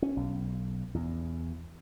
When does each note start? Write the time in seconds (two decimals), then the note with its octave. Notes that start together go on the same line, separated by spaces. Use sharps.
0.02 C#4
0.17 B1
0.95 E2